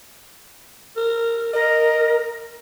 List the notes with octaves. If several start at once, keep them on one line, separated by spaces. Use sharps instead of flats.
A#4
A#4 D#5